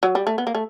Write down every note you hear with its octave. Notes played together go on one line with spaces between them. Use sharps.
F#3
G3
A3
B3
A#3
A3